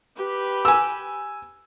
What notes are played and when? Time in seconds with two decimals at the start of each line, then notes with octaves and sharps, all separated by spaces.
0.17 G4 B4
0.65 G#5 E6